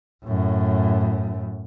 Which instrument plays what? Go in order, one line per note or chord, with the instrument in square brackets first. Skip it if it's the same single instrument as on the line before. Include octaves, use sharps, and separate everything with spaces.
[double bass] F#2 A2